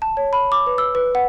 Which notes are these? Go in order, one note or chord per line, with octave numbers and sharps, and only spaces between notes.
A5
C#5
B5
D6
B4
E6
B4
F#5